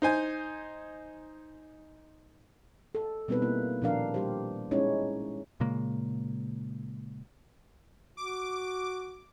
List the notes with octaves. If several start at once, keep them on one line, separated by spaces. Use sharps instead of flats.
D#4 C5 G#5
A4
B2 G3 B3 C4 D#4 B4
A#3 E4
A#2 D#3 F3 D4 A#4 F5
G3 G4 C5
G#3 C#4 D#4 E4 C#5
A#2 C#3 G#3 A#3
F#4 D6